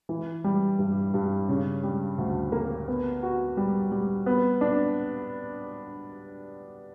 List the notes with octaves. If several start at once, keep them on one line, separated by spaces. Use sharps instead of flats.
E3
G3
G2
G2
C#3
G3
D2
A#3
B3
F#4
G3
G3
B3
D4